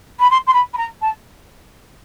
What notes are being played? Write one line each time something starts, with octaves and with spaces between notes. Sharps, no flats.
B5
C6
C6
B5
B5
A#5
A5